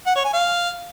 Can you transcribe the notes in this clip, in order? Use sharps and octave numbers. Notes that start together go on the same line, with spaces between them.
F#5
C#5
G#5
F5